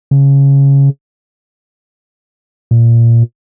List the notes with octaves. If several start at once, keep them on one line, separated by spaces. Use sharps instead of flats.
C#3
A#2